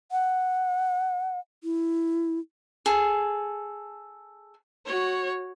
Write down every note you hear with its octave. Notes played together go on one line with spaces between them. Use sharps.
F#5
E4
G#4 A4
F#4 C#5